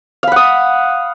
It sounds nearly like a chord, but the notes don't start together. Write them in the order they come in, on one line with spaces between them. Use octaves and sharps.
F5 B5 F#5 D#6